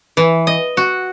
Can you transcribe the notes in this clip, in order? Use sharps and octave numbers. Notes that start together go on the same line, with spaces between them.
E3
D#5
F#4